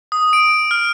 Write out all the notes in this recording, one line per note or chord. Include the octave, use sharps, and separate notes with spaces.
D#6
D7
F6